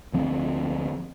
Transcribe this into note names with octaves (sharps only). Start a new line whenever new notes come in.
D2 F3 C4